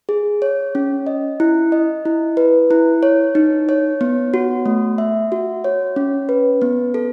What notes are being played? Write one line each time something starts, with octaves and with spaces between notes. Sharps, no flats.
G#4
C#5
C#4
D#5
E4
D#5
E4
B4
E4
C#5
D#4
C#5
B3
F#4
A3
E5
F#4
C#5
C#4
B4
B3
A4